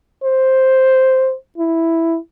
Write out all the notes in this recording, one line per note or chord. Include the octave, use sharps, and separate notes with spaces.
C5
E4